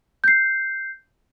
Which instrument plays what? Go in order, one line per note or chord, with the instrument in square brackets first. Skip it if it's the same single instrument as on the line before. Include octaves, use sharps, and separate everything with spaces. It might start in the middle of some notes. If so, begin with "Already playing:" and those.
[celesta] G6 C7